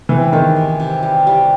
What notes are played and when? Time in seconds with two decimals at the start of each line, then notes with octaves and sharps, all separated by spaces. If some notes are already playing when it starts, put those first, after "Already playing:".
0.09 E3 C4
0.32 D#3 G#3
0.56 C3
0.80 C3
1.03 G3
1.27 G3